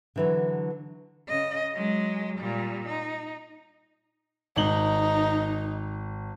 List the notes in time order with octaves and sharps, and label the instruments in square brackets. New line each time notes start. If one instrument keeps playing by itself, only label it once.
[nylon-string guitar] D3 E3 F#3
[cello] C#3 D#5
F#3 G#3
A#2 G3
D#4
[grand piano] G#1 F#7 G7 [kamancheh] D#4